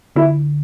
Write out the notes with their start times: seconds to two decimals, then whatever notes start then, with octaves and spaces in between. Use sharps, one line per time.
0.16 D3 E4